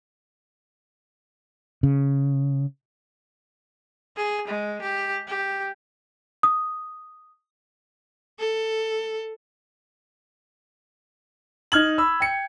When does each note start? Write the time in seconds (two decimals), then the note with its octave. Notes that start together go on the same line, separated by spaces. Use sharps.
1.83 C#3
4.17 G#4
4.48 G#3
4.81 G4
5.28 G4
6.43 D#6
8.39 A4
11.72 D#4 F6 G#6 F#7
11.98 B5 E6
12.20 G5 C#7